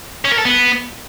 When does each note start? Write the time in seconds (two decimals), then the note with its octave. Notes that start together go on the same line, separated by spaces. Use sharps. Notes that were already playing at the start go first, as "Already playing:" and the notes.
0.25 C#4
0.32 A#4
0.38 A4
0.45 B3